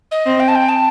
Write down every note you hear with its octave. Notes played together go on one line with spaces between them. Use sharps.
D#5
C4
G5
A5
G5
A5